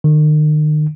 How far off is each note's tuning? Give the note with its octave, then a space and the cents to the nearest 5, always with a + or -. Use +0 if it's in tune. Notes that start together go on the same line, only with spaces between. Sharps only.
D#3 -40